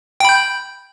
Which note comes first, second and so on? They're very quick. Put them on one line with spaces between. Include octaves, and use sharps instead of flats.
G5 B5 G6